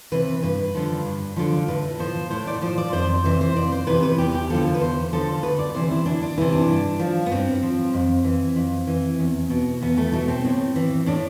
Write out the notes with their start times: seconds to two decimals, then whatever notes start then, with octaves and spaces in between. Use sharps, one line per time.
0.12 C3 E3 B4
0.43 G2 B4
0.75 D3 F3
1.05 G2
1.36 D3 F3
1.68 A2 B4
1.99 F3 C5
2.30 A2 C5
2.47 D5
2.62 F3 C5
2.78 D5
2.93 F2 C5
3.24 C3 E3 C5
3.41 C5
3.56 F2 D5
3.72 C5
3.87 C3 E3 B4
4.03 B4
4.18 E2 G4
4.35 G4
4.50 D3 F3 A4
4.66 A4
4.74 B4
4.81 E2 C5
5.13 D3 F3 A4
5.43 D2 B4
5.59 D5
5.74 C3 E3 C5
5.91 E4
6.06 D2 D4
6.22 D4
6.38 C3 E3 E4
6.52 D4
6.69 G2
6.99 F3
7.26 B3
7.31 G2 C4
7.63 F3
7.94 F2
8.25 E3
8.56 F2
8.87 E3
9.19 E2
9.50 B2
9.82 E2 B3
9.97 A3
10.12 B2 A3
10.28 C4
10.45 A2
10.76 E3
11.06 A2 D4